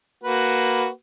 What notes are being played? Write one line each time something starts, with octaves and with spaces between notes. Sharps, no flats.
A#3 F#4 B4